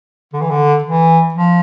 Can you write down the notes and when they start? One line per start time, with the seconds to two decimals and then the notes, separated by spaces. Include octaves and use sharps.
0.33 D3
0.42 E3
0.51 D3
0.84 E3
1.34 F3